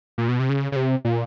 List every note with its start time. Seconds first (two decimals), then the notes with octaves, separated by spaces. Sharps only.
0.18 A#2
0.28 B2
0.39 C3
0.49 C#3
0.72 C#3
0.76 C3
1.05 A#2